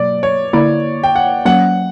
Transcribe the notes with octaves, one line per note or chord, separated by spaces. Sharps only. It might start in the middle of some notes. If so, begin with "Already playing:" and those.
Already playing: B2 F#3 A#3 D5
C#5
D3 A#3 E4 D5
G5
F#5
F#3 A#3 C#4 F#5